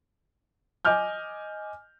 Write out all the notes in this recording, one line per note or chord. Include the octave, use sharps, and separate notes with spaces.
D#5 G#5 D6 F6 G6